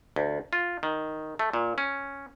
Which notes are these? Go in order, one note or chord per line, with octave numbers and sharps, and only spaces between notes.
D2
F4
D#3
A3
A#2
C#4